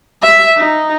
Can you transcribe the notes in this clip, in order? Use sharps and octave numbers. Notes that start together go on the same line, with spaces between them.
E5
D#4